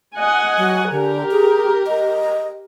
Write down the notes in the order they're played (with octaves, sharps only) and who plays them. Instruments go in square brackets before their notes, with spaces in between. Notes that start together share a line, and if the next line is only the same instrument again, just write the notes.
[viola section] D#5 F#5 G#5
[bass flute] F#3
[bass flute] D3 [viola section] G4 A#4
[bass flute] G#4
D#5